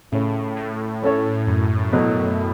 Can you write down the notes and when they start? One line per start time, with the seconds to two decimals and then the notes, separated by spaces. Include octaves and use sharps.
0.12 A2 C#3 A3 C#4
0.57 A2
1.02 A3 C#4 A4 C#5
1.47 F#2
1.93 B2 F#3 A3